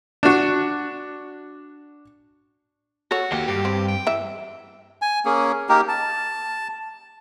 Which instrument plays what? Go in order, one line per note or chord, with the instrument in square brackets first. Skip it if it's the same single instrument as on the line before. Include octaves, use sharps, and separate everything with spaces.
[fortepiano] D4 F#4
[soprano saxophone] F#4 [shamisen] A4 C#5
[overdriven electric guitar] D#2 G4 [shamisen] A#3
[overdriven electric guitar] G2 [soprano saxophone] G4
[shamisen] C4
[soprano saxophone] G5
[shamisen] E3 E5
[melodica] G#5
A#3 C#4 G#4
A#3 D#4 G4 A#4
A5